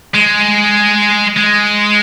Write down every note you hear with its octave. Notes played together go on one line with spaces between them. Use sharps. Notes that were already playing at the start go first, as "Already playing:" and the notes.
G#3
G#3